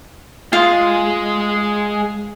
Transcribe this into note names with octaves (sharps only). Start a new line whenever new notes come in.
G#3 F4 D#5